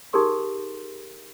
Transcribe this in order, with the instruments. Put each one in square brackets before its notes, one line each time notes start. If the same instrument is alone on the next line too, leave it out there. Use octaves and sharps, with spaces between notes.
[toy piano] D#4 G4 G#4 A#4 C6 D6